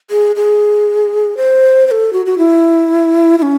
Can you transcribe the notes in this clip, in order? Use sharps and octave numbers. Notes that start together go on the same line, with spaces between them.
G#4
G#4
C5
C5
A4
F#4
F#4
E4
E4
C#4